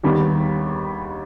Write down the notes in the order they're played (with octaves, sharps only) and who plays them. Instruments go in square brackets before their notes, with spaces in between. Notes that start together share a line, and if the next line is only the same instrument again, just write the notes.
[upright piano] D#2 D#3 G3 B3